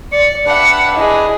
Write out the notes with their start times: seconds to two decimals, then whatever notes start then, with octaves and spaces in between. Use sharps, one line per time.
0.12 D5 C#7
0.46 D4 G4 B4 E5 F#5
0.96 E4 G#4 D#5